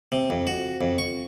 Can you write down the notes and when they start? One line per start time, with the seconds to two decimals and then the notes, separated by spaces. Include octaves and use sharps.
0.12 C3
0.30 F2
0.47 F#4
0.81 F2
0.98 C#6